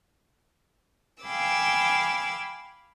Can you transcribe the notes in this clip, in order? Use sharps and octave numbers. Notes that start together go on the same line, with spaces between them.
F5 G5 G#5 B5 D6 E6